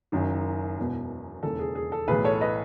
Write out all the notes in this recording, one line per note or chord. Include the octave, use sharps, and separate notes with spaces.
F#1 F#2 D#3
E1 E2 B2
E1 D#2 C#3 E3 A4
G#4
G#4
A4
B1 A2 E3 G#4 B4
A4 C#5
B4 D#5